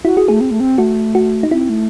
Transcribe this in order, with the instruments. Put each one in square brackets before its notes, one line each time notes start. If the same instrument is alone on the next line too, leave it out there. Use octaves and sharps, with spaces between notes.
[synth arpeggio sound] E4 [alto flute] F#4
[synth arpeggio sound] F#4 [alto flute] G#4
[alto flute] A3 [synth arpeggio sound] G#4
[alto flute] C4
A3
C4
[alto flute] A3 [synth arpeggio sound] F#4
[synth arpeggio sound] F#4
D#4
[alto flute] C4 [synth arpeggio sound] E4
[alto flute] A3